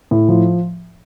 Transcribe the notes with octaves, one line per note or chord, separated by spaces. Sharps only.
A2
F3